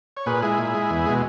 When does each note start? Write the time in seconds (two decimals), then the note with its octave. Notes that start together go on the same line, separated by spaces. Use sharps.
0.17 C#5
0.26 A#2 G#4 B4
0.42 G#3 E4 G#4
0.58 A#2
0.74 G#3
0.90 E2
1.06 B2 G#3